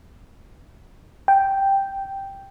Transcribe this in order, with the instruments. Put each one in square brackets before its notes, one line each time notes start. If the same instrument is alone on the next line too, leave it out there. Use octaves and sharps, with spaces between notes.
[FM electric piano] G5